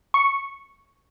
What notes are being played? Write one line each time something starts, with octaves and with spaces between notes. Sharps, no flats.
C#6